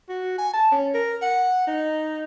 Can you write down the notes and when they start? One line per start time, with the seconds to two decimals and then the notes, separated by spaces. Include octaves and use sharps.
0.09 F#4
0.38 G#5
0.54 A5
0.72 C#4
0.94 A#4
1.22 F#5
1.67 D#4